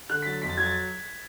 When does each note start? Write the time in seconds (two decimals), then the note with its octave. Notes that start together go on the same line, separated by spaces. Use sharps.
0.10 D3 F#6
0.22 B6
0.26 F#3 A6
0.42 F2 B6
0.49 A6
0.58 F#3 G#6
0.66 A6